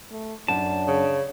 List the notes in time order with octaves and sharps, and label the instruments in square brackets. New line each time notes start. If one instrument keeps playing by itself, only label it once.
[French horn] A3
[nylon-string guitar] F#2 [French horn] D4 [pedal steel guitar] A5
[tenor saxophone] C#3